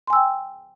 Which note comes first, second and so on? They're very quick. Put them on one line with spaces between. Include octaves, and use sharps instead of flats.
C6 G#5 E6 G5